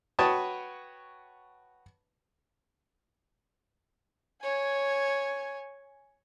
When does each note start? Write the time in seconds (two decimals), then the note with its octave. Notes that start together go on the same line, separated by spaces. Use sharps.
0.19 F#4 B4 C#5 G5 A5 D#6
4.43 C#5 G#5